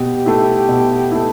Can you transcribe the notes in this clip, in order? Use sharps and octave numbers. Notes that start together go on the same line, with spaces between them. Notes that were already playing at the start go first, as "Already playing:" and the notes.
Already playing: B2 G4
A3 E4
B2
A3 E4